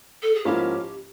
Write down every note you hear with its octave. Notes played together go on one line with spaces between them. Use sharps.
A4
G#4
G#2 F3 A#3 C#4 E4 G4